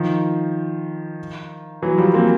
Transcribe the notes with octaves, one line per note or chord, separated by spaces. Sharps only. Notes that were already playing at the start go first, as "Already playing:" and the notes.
Already playing: D#3 F3
E3 F#3
F3 G3
A#3 C4